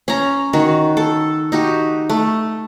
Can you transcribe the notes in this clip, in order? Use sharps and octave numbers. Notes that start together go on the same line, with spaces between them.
C#4 A#5
D#3 F#4
A4
D#4 F#4 G4
A3